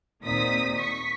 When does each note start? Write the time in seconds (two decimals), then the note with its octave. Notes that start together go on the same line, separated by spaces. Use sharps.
0.23 D#2 A#2 C4 D#4 D#6 B6
0.75 C#6 B6